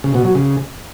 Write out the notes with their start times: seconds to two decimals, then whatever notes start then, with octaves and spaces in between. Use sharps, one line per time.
0.04 C#3
0.14 B2
0.25 F#3
0.35 C#3